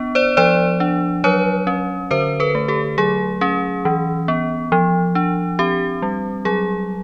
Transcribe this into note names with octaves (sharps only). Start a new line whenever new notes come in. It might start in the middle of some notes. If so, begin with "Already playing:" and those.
Already playing: B3 D4
C5 D5
F3 C5 D5
D4
F#3 B4 C#5
C#4
D3 A#4 C5
A4 B4
A3
G4 A4
F#3 G#4
C#4 G#4
E3
B3
F3
D4
C4 G4
G3
F#3 G#4